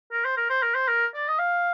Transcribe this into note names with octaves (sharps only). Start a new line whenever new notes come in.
A#4
C5
A#4
C5
A#4
C5
A#4
D5
D#5
F5